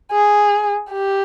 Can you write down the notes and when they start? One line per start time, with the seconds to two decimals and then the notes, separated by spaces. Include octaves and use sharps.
0.12 G#4
0.91 G4